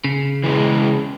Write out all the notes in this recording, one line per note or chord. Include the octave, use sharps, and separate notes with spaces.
C#3
E3 G3 G#3